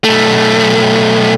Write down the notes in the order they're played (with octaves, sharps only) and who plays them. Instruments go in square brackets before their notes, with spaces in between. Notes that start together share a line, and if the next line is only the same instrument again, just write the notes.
[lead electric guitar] B1 A3